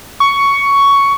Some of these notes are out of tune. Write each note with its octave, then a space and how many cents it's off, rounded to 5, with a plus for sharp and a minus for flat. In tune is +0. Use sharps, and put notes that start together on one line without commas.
C#6 +10